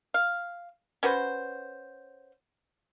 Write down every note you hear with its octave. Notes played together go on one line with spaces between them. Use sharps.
F5
C#4 F#4 B4 C5